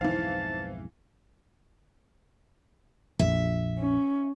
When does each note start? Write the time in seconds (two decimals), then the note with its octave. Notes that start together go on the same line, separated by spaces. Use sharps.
0.01 B1 F2 G#2 E3 D#4 C5 F5 A5
3.19 A#1 F2 E5
3.79 C#4